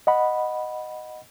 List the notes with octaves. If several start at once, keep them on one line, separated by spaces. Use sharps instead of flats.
D#5 F#5 B5